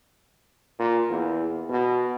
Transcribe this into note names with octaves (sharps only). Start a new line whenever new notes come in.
A#2
E2
B2